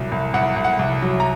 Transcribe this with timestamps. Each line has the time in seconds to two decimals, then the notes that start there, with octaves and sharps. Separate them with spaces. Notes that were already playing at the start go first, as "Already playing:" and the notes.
Already playing: C2 A#2 F#3
0.12 C2
0.34 C2 F#5
0.56 C2
0.64 F#5
0.79 C2
1.02 F#3
1.20 A#5